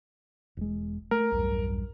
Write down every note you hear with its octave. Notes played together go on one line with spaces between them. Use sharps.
E1 G#3
A3 A#4
B1 E2 G2